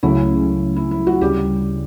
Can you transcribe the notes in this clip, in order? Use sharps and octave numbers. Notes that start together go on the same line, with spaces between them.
C#2 C#3 F#3 A3 C#4 E4
E4
E4
F#4
D2 C#3 G3 G4